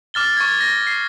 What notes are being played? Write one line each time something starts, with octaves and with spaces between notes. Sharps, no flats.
D6 F6 A6 G7
C#6 G#6
A#6
C7